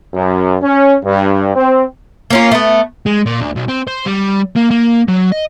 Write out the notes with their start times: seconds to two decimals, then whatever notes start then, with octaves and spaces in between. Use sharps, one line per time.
0.13 F#2
0.62 C#4
1.04 G2
1.55 C4
2.30 A#3 C#4 F4
2.52 A3 B3
3.06 G#3
3.26 A#2
3.41 D2
3.56 B1
3.68 C4
3.87 C5
4.06 G3
4.56 A#3
4.71 A#3
5.08 F#3
5.32 D#5